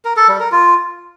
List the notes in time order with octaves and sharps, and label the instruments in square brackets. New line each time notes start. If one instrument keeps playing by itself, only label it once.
[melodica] A#4
A4
G3
A#4
F4